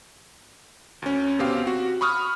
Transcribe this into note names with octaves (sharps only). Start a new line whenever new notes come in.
D2 C#4
B2 C4 G4 F5
F#4
B5 C#6 D#6 F6